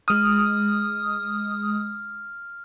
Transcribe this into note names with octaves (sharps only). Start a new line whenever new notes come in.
G#3 D#6 F6